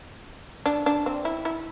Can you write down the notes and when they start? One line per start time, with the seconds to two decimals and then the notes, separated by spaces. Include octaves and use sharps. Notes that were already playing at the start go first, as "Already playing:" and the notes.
0.66 D4
0.86 D4
1.06 C4
1.25 E4
1.45 E4